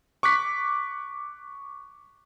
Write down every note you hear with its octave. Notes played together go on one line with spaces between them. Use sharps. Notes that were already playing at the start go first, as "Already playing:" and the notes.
C#6 D6 F#6 B6